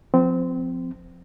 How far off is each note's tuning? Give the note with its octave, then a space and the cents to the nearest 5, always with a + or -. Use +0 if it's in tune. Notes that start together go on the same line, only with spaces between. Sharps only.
F3 +15 C4 -20